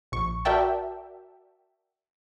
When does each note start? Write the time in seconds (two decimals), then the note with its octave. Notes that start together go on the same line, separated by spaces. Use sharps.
0.12 A#1 C#6
0.45 F#4 A#4 D5 E5 G5 A5